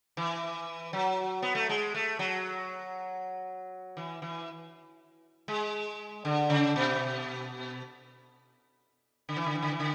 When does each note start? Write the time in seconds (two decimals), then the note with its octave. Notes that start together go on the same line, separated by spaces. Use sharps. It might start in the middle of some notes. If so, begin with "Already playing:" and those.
0.17 E3
0.93 F#3
1.42 B3
1.55 A3
1.69 G#3
1.94 A3
2.19 F#3
3.97 E3
4.22 E3
5.48 G#3
6.25 D3
6.50 C#3
6.76 B2
9.29 D3
9.37 E3
9.46 D3
9.55 E3
9.63 D3
9.72 E3
9.80 D3